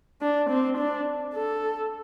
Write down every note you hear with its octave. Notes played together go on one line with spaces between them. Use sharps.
D4
C4
D4
A4